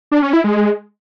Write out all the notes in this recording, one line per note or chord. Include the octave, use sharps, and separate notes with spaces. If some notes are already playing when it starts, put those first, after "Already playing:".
D4
C#4
E4
G#3